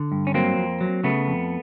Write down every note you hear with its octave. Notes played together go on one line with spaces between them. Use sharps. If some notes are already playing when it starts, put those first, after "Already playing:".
Already playing: D3
G2
C#4
F#3 A#3 C4
F2
F#3
C#3 A3 B3
F2